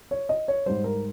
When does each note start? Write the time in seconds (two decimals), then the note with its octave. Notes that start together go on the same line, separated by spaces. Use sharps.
0.11 C#5
0.29 D#5
0.48 C#5
0.66 G#2 G3 C5
0.84 A#4